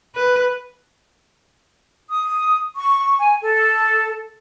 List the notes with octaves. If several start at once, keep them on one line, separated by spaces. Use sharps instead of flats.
B4
D#6
C#6
G#5
A4